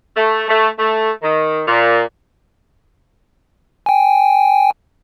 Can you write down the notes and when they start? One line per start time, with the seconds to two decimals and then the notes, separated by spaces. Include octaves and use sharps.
0.17 A3
0.49 A3
0.78 A3
1.22 D#3
1.68 A#2
3.86 G5 G#5